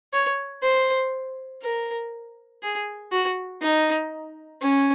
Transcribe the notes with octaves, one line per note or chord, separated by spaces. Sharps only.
C#5
C5
A#4
G#4
F#4
D#4
C#4